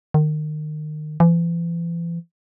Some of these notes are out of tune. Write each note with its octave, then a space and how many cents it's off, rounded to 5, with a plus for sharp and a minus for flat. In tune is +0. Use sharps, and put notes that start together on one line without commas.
D#3 -30
E3 +40